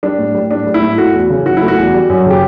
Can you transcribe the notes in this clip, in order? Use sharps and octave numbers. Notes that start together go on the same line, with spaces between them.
G3 D4
A2
G3
A2 D4
G3
E4
A2
A3 F#4
E2
C#3
F#3 F#4
A3 E4
F#4
E2
G3
F#2
C#3 G4